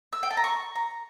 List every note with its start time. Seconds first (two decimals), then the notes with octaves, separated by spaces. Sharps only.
0.13 E6
0.23 G5
0.31 A5
0.37 A#5
0.44 C#6
0.76 A#5